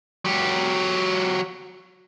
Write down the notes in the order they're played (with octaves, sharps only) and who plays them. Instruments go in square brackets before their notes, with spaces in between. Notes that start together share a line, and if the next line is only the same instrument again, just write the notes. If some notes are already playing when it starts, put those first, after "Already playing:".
[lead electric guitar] F#3 G4